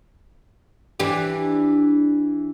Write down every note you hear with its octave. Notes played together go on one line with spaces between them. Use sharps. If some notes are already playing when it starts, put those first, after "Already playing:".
E3 D4 G4